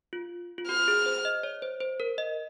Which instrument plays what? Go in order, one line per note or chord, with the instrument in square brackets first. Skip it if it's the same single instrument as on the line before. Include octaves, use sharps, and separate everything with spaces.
[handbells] F4
F4
[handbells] F#4 [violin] F6
[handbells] G#4
C5
D#5
C#5
C5
C5
A#4
D#5